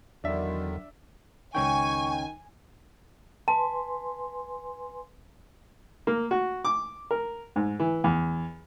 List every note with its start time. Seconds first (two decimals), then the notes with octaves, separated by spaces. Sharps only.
0.24 E2 D3 D#3 F#3 D4 E5
1.55 C#2 D#3 C#4 G5 G#5 C#6
3.48 B4 G#5 A5 C6
6.07 A#3
6.31 F#4
6.65 D6
7.11 A#4
7.56 G#2
7.80 E3
8.04 E2